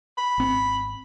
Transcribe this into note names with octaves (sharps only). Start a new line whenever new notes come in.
B5
G#1 C4